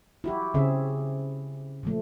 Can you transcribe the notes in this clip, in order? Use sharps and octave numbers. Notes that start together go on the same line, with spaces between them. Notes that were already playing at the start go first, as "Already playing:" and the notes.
E4 F#4 G4
C#3 C4 C#4 G#4 E5
A#2 F3 A3